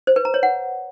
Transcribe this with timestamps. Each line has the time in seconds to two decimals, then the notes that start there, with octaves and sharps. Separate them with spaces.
0.07 C5
0.16 B4
0.25 A#5
0.34 C#5
0.43 F#5